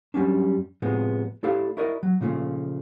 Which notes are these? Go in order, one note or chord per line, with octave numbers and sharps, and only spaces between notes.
F#2 G3 A#3 C#4 D4
A2 C3 F3 G#3 B3
A3 E4 G4 A4 D5 F5
E4 F#4 A#4 D5 D#5
F#3
A#2 C#3 F3 G3 A3